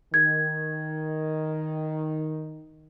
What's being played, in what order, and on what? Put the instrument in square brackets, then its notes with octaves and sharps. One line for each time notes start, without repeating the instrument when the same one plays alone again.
[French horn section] D#3 [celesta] G#6